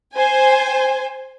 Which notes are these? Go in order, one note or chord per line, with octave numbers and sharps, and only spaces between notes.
C5 G#5